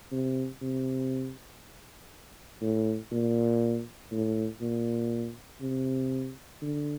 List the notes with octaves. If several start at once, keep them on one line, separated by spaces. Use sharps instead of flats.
C3
C3
A2
A#2
A2
A#2
C3
D3